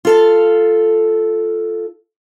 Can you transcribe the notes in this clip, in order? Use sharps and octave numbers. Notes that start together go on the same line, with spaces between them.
F4 A4 F5